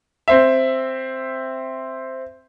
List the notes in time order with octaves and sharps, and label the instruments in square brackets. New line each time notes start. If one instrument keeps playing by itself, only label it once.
[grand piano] C4 C5 E5